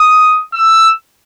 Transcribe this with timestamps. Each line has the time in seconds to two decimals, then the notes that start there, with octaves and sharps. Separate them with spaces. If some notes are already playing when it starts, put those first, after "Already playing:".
Already playing: D#6
0.54 E6